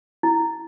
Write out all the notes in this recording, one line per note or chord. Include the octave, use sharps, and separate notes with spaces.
E4